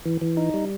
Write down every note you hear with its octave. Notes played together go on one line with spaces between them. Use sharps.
E3
E3
D#4
G3